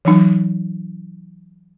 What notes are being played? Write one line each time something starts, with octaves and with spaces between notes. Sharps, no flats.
E3 F#3 D#4